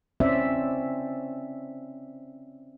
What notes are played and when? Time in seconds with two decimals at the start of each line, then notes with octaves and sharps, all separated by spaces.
0.20 C4 C#4 C5 D5 E5